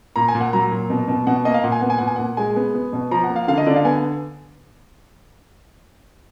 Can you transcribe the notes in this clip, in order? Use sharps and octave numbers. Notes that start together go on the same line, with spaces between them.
A#2 A#5
G#5
A#2
F#5
F#3 A#5
A#2
B2
B2
B2 F#5
A#3 D#5
F5
A#2 F#5
G#5
B3 F#5
G#5
A#2 F#5
G#5
A#2 F#5
G#3 G#5
B3
B3
B2
F3 A#5
F#5
A#3
F5
D3 F5
D#5
D3 D5
F5
B3 G#5